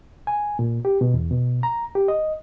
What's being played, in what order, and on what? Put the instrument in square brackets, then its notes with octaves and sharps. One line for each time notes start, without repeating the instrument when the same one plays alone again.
[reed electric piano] G#5
A#2
G4
B2
E2
B2
A#5
G4
D#5